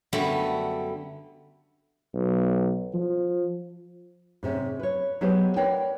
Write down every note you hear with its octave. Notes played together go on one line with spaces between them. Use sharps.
F#2 D3 G3 A3 B3
B1
F3
G#2 C3 C#4
B4 C#5
F#3 G#3 B3 G4 B4 C5
A#4 B4 C#5 D5 F#5 G5